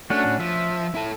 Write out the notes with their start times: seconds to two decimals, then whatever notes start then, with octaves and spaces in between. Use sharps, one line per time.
0.10 A3 C#4 D4 F#4
0.25 A2
0.40 F3 E5
0.95 E4 A4